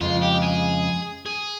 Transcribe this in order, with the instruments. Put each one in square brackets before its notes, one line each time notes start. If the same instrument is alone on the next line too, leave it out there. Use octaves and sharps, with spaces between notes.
[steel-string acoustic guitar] F2 C#3 G#3 [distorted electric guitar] F4
[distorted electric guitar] G4
G#4
G#4